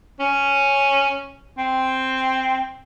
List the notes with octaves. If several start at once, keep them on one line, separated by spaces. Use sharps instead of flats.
C#4
C4